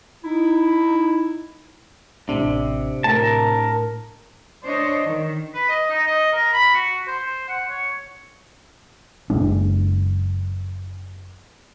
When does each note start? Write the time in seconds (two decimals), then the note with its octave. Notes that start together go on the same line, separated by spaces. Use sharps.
0.24 D#4 E4
2.29 A1 C3 D4
3.04 A2 A#4 A5
4.62 D4 C5 C#5 D#5
5.04 D#3
5.54 B4
5.69 D#5
5.90 D#4
6.07 D#5
6.32 A#4
6.53 B5
6.74 F#4
7.08 C5
7.48 F#5
7.70 C#5
9.30 F#1 G#3 D4